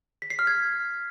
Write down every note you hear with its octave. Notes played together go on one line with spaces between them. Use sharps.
B6
C7
F6
G#6